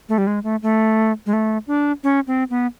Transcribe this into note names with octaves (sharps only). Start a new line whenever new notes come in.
A3
G3
G#3
A3
A3
G#3
A3
D4
C#4
C4
B3